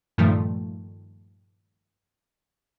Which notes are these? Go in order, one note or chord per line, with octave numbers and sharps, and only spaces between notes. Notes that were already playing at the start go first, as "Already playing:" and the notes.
G2 A#2 D#3 F3 A3